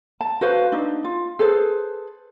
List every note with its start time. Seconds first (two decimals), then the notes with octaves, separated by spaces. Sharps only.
0.21 A5
0.41 F#4 B4 C5 F5
0.72 D4 D#4
1.04 F4
1.39 G#4 A4 B4 C5